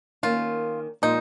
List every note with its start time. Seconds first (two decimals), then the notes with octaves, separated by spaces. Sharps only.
0.23 D#3 A#3 C#4 F4
1.02 A#2 F3 G#3 D#4